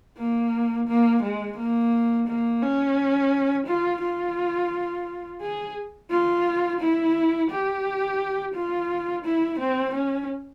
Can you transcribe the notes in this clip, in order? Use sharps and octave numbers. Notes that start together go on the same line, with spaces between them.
A#3
A#3
G#3
A#3
A#3
C#4
F4
F4
G#4
F4
E4
G4
F4
E4
C4
C#4